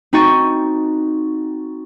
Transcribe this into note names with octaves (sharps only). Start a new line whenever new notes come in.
C4 D#4 F#4 C#6 A6 D#7